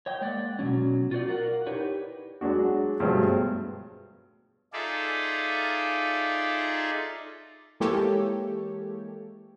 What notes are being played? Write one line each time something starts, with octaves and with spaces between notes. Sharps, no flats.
C#5 D#5 G5
G#3 A#3 D5 F#5
B2 E3 F#3 C#4
F4 F#4 C5 D5
A#4 F5 F#5
D#4 E4 G4 B4 C#5 D5
F#3 G#3 D4 F#4
G2 B2 F3 F#3 G#3 A3
D#4 F4 G#4 A4 D5 E5
E3 G#3 A#3 G4 A4 C#5